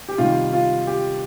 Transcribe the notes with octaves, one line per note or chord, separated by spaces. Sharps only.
G4
C3 D#3 G3 F4
F4
G4